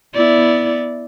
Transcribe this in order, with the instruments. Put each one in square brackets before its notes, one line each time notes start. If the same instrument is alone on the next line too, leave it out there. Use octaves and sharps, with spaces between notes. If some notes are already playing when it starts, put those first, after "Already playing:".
[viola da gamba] B3 E4 D5